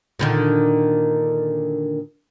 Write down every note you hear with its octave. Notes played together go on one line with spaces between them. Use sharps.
A#2 D3 D#3